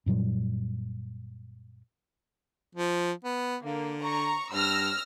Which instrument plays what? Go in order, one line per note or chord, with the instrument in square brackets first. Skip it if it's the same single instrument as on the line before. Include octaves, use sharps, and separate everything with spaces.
[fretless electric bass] F#2 A#2 F#3 G3
[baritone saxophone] F3
B3
[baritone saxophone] D3 [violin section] A#3
[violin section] A#5 C#6
[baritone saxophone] G2 [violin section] E6 F6 A#6